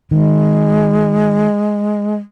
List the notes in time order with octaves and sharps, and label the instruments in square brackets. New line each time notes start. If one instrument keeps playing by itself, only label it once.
[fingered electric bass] D#3 [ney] G#3